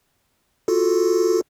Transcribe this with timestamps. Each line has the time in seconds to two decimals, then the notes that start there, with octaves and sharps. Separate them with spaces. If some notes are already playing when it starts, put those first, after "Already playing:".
0.68 F4 F#4 A4